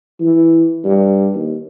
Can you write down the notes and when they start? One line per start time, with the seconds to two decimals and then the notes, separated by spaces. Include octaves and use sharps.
0.20 E3
0.84 G2
1.34 D#2